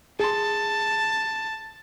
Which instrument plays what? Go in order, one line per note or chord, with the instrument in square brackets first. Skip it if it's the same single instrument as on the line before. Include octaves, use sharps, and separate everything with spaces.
[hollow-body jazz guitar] G#4 C6 [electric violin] A5